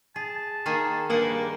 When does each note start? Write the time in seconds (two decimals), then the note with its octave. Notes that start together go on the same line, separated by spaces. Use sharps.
0.16 G#4 A5
0.66 D#3 A#3 G#4
1.10 G2 A#3 G#4 F#5